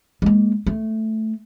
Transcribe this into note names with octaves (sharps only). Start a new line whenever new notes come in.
G#3 A#3
A3